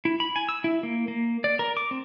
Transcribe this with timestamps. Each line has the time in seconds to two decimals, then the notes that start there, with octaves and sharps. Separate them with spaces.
0.05 E4
0.20 B5
0.36 G#5
0.49 E6
0.64 E4
0.83 A#3
1.08 A#3
1.44 D5
1.59 A#4
1.77 D6
1.91 C4